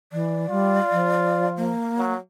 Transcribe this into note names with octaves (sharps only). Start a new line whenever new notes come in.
E3 D5
G3 F4
F3
A#3
F#3